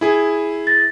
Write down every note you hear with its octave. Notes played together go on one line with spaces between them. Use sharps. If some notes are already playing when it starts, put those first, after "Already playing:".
E4 G#4
A6 A#6